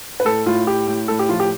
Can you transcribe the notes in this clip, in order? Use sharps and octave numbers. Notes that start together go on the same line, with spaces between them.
B4
A2 A4
A2 F4
A2 G4
A2
A2 A4
G4
F3 F4
G4